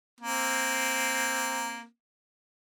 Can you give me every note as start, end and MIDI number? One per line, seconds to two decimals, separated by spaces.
0.21 1.85 58
0.21 1.85 60